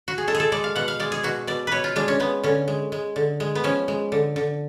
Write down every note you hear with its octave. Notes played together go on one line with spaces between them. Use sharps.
F#4
G#4
G#3 A4
G#4
A4
G#3 D5
F5
B2 F#5
F5
G#3 D5
G#4
B2 F#4
B2 D5
B2 B4 C#5
F4
G#3 D4
C#4
G#3 B3
D3 C#4
G#3
G#3
D3
G#3
B3
F3 C#4
G#3
D3
D3